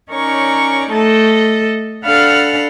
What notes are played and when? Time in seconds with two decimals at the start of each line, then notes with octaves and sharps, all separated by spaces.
0.10 C#4 D#4 A#4 C#5 D5 C#6
0.90 A3 A4 D#5 A5
2.04 D4 A4 F5 F#5 B5 F6